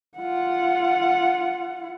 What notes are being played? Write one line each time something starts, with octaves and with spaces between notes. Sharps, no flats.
F4 F#5